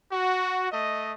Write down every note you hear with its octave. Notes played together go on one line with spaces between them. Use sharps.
F#4
A3 D#5